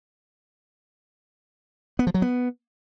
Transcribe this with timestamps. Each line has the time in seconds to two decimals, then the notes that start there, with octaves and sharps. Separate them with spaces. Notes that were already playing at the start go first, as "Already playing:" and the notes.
1.99 B3
2.07 F3
2.14 F#3
2.22 B3